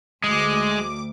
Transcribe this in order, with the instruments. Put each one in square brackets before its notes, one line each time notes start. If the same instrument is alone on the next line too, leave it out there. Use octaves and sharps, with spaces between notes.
[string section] D2 D6 [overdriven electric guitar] G#3